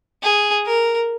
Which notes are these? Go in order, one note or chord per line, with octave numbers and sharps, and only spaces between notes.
G#4
A#4